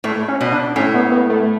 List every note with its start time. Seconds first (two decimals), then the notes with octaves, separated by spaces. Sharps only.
0.04 A2 A3
0.28 C#4
0.41 B2
0.52 D4
0.76 A2 C#4
0.94 B3
1.12 B3
1.30 A3